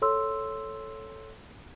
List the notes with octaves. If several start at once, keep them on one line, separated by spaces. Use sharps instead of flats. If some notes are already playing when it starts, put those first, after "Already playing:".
A4 C#5 C6 E6